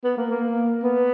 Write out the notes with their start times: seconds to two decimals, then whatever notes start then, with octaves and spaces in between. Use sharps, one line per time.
0.04 B3
0.17 A#3
0.30 A#3
0.83 B3